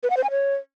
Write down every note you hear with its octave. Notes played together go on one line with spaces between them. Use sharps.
B4
F#5
C5
G#5
C#5